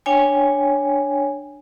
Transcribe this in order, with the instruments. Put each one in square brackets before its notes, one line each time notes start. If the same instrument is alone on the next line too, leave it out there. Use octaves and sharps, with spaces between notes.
[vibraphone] D4 C#5 G5 G#5